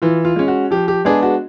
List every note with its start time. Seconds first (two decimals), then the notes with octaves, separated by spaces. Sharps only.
0.02 E3 F4
0.25 F4
0.36 G#3 C#4
0.48 F#4
0.71 F3 G4
0.88 G4
1.05 G#3 B3 D4 G#4
1.23 F#4